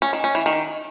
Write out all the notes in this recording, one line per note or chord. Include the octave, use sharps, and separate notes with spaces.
C#4
D#3
C#4
E3
D#3